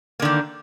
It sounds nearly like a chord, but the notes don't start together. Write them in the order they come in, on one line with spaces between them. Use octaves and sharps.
A#3 D3 D#3